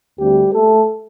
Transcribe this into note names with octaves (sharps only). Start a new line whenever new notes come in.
D2 D3 G3 A3 C4 G4
A3 A4